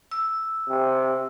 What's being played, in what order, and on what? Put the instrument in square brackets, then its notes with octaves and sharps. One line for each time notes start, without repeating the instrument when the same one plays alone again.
[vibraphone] E6
[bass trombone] C3